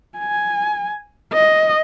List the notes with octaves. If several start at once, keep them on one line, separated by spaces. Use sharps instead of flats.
G#5
D#5